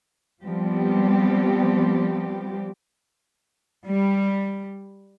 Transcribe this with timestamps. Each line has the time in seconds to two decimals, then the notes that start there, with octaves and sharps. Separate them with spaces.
0.43 F3 G3 B3 C4 G4
3.87 G3